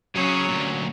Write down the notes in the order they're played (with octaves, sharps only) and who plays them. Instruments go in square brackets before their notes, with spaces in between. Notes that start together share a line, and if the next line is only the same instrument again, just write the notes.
[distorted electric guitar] C#3 G#4 [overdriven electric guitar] F#3 [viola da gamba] C#4 C#5
[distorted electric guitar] D2 A#2